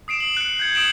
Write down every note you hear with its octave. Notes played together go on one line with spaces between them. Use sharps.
D#6 C7 D7 E7
F#7
F#6 C#7
G6 G#6 C#7
D#6 C7 D7 E7 F#7